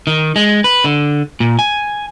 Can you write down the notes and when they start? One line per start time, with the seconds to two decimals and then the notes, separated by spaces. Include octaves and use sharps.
0.07 D#3
0.36 G#3
0.64 B4
0.84 D3
1.40 A#2
1.59 G#5